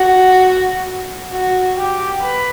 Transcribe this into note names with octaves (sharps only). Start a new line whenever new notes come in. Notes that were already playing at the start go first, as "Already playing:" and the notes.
Already playing: F#4
F#4
G4
B4